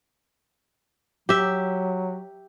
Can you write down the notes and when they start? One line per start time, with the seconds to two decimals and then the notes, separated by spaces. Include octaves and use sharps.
1.29 F#3 G4 E5